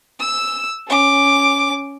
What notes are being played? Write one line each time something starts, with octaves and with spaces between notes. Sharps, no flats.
E6
C#4 D6